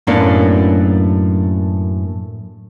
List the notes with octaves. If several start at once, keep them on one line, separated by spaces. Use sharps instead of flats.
F#2 A2 F#3 A#3 B3 D4